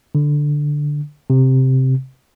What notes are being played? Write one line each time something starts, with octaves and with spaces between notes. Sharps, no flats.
D3
C3